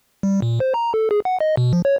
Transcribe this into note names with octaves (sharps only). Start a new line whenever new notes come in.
G3
A#2
C5
A#5
A4
G#4
F#5
D#5
B2
F3
C#5